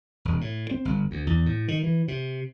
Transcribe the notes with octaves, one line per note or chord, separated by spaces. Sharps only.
E1
A2
C4
G1
D2
E2
A2
D#3
E3
C3